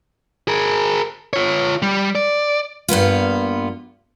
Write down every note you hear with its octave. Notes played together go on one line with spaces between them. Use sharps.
G#4 A#4
F4 C#5
G3
D5
G2 A#3 B3 F4